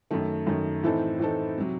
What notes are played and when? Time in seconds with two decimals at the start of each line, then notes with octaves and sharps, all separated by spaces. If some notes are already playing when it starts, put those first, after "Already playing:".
0.11 F#2 D#3 A3
0.47 F#2 D#3 A3
0.83 A2 E3 C4 D#4 A4
1.19 A2 E3 C4 D#4 A4
1.58 C3 F#3